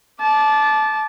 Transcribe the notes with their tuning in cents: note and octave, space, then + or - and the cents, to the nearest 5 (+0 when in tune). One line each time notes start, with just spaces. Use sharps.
A5 -20 D6 +0